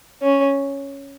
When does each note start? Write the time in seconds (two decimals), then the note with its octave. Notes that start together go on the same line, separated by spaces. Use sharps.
0.22 C#4